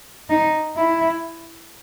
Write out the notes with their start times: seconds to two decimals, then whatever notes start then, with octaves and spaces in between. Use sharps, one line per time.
0.29 D#4
0.76 E4